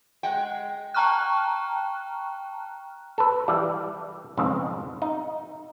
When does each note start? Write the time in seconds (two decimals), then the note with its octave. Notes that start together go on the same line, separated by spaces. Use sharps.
0.23 G#3 F#5 G5
0.94 G5 A5 A#5 C#6 F6 F#6
3.18 A4 B4
3.48 E3 G3
4.37 B1 F2 G#2 C#3
5.02 D#4